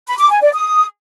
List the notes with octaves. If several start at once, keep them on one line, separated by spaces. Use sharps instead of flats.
B5
D6
G#5
D5
D#6